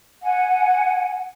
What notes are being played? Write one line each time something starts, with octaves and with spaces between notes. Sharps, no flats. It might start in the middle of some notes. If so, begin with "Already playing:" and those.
F#5 G#5